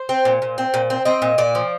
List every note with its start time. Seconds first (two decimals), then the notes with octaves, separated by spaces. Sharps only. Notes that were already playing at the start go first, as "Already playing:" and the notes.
Already playing: C5
0.09 C4
0.25 A#2
0.42 A#2
0.58 C4
0.74 A#2
0.90 C4
1.05 C4 D#5
1.22 A#2
1.38 A#2 D5
1.55 F3